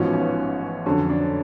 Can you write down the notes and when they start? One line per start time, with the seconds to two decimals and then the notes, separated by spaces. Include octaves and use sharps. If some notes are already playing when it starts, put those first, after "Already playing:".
Already playing: A1 G#2 F3 B3 C#4 F#4
0.14 C#4
0.86 F2 D3 F#3 C#4
1.10 D4